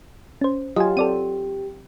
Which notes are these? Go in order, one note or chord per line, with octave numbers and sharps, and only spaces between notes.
C#4 C5
F#3 F4 G4 D#5 G#5
C4 A4 D5 D#7